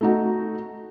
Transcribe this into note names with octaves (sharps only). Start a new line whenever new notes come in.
A3 D#4 F#4